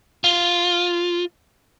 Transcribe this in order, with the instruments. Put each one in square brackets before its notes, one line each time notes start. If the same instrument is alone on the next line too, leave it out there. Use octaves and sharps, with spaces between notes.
[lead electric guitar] F4